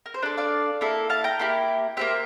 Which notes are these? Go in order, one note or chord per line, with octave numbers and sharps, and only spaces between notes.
A#4
C5
D4 A4 A#4 D5
D5 F5
A#3 E4 A4
F5 A5
G5 A#5
A#3 E4 G4
A#3 E4 G4 C5 E5